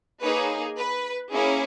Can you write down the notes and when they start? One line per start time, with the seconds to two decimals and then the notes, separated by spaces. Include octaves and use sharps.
0.21 A#3 D#4 G#4 B4 C#5
0.77 B4
1.32 A#3 C#4 E4 G#4